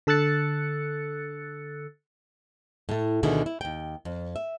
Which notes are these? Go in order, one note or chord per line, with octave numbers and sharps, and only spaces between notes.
D3 A4 E6 F#6 A6 C#7
A2 A3
D2 B2 D3 D#3 E4 G#4
E4
D#2 G5
F2
E5